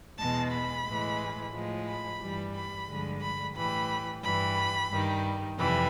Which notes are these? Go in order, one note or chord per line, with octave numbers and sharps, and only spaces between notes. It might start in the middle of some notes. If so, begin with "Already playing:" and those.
E2 B2 G#3 A5
B5
A2 E3 G#3
A2 F3 G#3
B5
G2 E3 G3
B5
G2 D3 F3 G#3
B5
A2 E3 G3 B5
G2 E3 G3 B5
G2 D#3 G3
F2 C3 E3 G3 B5